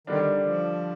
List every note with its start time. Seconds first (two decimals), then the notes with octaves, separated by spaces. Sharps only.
0.07 D3 D#3 G3 D4
0.45 F3